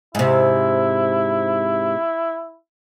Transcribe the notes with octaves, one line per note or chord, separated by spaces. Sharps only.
G#2 C3 E4